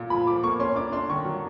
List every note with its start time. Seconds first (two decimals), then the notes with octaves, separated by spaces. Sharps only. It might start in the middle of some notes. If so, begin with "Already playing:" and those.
Already playing: A#2
0.10 F3 B5
0.26 F3 D6
0.43 A#3 C#6
0.60 C#4 C6
0.75 D4 D6
0.92 D4 C6
1.09 D#3 C#6
1.25 F#3